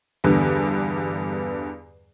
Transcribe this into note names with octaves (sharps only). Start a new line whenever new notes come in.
E2 G2 D3 B3